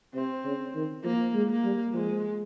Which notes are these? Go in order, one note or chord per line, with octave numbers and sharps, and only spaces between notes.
C3 C4
C#3
D#3
F3 A#3
G#3
A#3
G3
F3 G#3